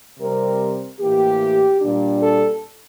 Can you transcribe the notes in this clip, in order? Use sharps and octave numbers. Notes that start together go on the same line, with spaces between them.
C3 G3 C4 A#4
A2 E3 A#3 G4
A#2 G3 D4
A4